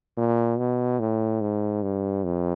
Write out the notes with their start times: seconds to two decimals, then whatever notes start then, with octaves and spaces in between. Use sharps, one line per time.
0.17 A#2
0.58 B2
0.99 A2
1.41 G#2
1.83 G2
2.24 F2